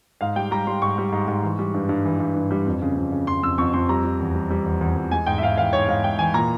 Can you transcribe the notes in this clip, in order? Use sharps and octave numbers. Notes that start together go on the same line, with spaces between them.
G#2 F5
G3 G5
G3 A#5
G3 C6
G#2 C#6
G3
G#2
G#2
E3
G3
G2
G2
E3
G2
G2
G3
F2
C#3
F2
C#3
F2 C6
F2 E6
F2 C#6
F2 C6
G3 A#5
G3
E2
G3
G3
E2
E2
E2
G#3 G#5
G#2 G5
E5
G#2 F5
E3 F5
G#2 C#5
G#2 F5
G#2 G5
E3 G#5
A#2 A#5